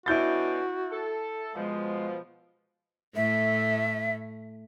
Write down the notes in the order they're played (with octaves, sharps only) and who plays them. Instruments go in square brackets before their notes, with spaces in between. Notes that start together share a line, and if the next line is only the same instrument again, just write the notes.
[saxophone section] B2 C#4 D4 [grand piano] E4 G6 A6 [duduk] F#4
[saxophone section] A4
[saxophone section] B2 F3 [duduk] G#3
[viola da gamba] A2 A3 [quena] E5